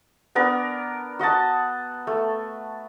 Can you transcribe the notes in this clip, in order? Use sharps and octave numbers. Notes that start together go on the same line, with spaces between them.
B3 D4 A#4
F#4 D#5 F#5 A5
A3